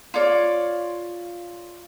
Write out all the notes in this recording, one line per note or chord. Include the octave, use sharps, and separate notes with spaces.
F4 C#5 D5